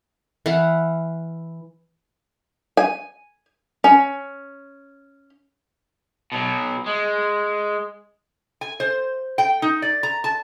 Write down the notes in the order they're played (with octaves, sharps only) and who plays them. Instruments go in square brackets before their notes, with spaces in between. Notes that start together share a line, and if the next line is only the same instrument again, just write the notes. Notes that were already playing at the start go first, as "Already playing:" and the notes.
[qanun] E3 F5 F#5
[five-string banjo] G#5
C#4
[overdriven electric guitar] B2 F#3
G#3
[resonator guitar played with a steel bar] G#5
C5
G5
D#4
D5
A#5
A5